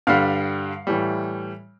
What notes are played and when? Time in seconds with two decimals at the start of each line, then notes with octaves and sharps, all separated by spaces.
0.07 G2 D3 G3 F5 F6
0.87 A2 E3 G3